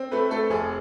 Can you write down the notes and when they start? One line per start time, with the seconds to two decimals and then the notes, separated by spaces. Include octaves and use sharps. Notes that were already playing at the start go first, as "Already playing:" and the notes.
Already playing: C4
0.11 A3 B4
0.31 A3 A4
0.50 F1 G#4